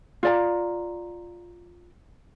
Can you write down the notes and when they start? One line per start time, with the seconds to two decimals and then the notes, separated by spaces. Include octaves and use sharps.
0.23 F4 D5 A#5